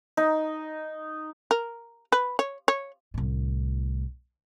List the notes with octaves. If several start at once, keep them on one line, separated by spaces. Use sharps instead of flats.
D#4
A#4
B4
C#5
C#5
C2 A2